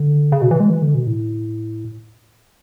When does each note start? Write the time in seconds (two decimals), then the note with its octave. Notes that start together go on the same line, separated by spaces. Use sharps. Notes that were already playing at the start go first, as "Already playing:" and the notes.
Already playing: D3
0.32 C#3
0.42 B2
0.51 E3
0.60 G#3
0.70 E3
0.82 D3
0.95 B2
1.07 A2